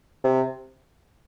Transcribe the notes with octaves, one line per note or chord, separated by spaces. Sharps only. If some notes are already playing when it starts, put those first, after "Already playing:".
C3